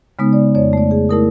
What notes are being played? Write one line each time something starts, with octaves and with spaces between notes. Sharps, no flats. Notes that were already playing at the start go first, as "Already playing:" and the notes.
C#3 G#3 B3 D#4
D5
F2 C#5 D5
A3 D5
G#4
A3 E4 A#4 D#6